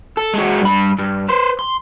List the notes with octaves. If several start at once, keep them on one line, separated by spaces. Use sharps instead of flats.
A4
G#3 F#4
G2 B5
G2
B4 C5
C6